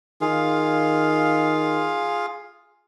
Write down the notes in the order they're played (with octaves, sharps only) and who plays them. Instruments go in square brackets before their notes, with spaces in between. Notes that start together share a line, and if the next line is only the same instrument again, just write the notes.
[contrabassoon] D#3 [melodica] F4 G#4 F5